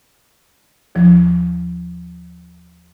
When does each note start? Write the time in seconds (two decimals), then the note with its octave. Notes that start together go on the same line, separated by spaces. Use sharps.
0.95 D#2 F3